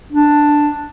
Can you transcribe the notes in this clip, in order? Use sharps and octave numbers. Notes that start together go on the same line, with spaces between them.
D4